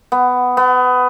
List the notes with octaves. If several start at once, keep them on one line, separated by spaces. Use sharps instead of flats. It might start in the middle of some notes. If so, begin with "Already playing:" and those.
B3
B3